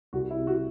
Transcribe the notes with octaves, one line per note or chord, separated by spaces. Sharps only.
C2 F#4
E4
C3
F#4